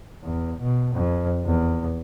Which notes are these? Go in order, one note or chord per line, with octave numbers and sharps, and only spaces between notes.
E2
B2
F2
E2